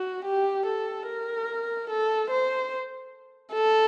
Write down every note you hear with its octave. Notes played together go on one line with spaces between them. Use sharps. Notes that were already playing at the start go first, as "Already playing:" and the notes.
Already playing: F#4
G4
A4
A#4
A4
C5
A4